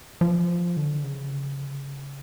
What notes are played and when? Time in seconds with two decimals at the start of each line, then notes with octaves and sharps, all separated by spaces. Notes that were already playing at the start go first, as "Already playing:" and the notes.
0.21 F3
0.77 D3
1.04 C#3